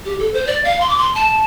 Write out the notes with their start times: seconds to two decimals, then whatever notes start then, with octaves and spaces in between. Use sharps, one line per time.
0.05 G4
0.19 A4
0.34 C5
0.47 D5
0.65 F5
0.81 C6
0.89 D6
0.98 C6
1.15 A5